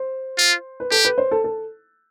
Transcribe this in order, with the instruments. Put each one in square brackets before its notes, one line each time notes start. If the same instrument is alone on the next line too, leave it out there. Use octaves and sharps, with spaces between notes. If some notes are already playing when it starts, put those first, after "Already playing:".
Already playing: [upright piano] C5
[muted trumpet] F4
[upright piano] B4
[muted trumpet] G4 [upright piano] A4
[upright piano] B4
C5
A4
A4